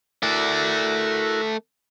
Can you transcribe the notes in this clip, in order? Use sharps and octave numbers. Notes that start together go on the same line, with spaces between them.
A3 E4 F#4 A#4 D5